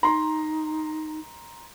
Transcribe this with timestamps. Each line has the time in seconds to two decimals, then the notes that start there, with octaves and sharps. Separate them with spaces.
0.03 D#4 A#5 C6